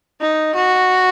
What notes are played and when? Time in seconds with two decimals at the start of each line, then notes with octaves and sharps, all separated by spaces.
0.21 D#4
0.55 F#4